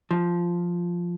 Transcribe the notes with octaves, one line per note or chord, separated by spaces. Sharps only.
F3